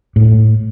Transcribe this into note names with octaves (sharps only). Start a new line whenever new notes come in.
A2